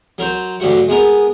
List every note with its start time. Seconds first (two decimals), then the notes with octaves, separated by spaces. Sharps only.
0.18 F#3 A#4 C5
0.60 D2 G2 F#3 F#4 F#5
0.88 G#3 B3 A#4